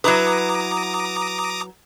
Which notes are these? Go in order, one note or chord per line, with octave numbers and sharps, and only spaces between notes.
F#3 E4 B4 A#5 D6 D#6